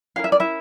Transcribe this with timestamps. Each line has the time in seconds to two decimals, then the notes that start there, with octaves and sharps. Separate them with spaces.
0.16 C#4 E4 A#4 F5
0.24 E5
0.32 D5
0.40 E4 E5